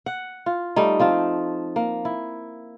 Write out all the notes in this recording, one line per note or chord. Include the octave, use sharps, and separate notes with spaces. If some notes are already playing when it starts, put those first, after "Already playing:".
F#5
F4
G3 A3 D#4
F3 C4 F4
A#3
E4